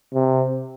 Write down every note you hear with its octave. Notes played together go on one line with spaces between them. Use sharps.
C3